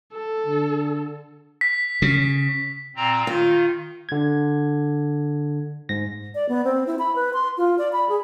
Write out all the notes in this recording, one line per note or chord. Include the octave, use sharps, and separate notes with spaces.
A4
D3
B6
C#3
A#2 C4 A#5
D#3 F4
D3 G#6
G#2 A#6
D5
B3
C4
E4
B5
B4
C6
F4
D5
B5
G#4